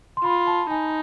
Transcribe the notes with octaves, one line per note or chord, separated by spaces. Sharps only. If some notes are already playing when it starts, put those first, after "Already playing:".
C6
F4 B5
A5
D#4 G#5